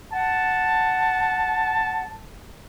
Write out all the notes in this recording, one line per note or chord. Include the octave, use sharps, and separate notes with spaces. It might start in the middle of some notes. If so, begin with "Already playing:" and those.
F#5 A5